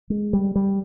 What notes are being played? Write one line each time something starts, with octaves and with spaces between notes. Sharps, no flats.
G#3
G3
G3